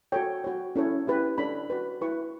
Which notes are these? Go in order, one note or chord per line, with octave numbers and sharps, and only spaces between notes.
F#4 A4 C#5 G5
F#4 C#5
C#4 E4 A4 C#5
E4 G4 B4
D4 A4 C#5 B5
F#4 B4
E4 B4 C#6